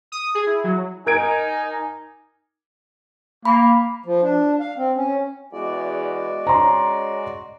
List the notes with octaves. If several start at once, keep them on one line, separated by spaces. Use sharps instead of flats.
D#6
G#4
E4
F#3
D#4 A#4 G#5 G#6 D7
A#3 B5
F3
D4
F5
C4
C#4
E2 G#3 F#4 D5
C#4 A#5 C6